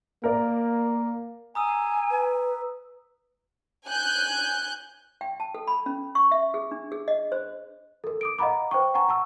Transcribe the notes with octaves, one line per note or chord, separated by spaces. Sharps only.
A#3 A#4 D5
G#5 A#5 D#6 E6
B4
G#5 F#6 G6
G5
A5
A4
B5
C#4
C#6
E5
G#4
D4
G#4
D#5
C5
A4 A#4
D6 D#6 D7
D#5 F5 F#5 A#5 B5 D6
B4 C5 G5 C#6
F#5 G#5 A#5 C#6
F#5 A5 C#6 E6